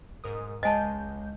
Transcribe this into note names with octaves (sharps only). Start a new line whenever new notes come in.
G#2 A#4 D#6
C#2 G#3 D#5 G#5 A5 G6